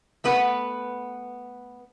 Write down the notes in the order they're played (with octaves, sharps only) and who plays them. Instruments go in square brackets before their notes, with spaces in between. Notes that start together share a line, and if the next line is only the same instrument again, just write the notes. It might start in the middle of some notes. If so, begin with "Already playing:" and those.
[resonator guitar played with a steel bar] A3 B3 B4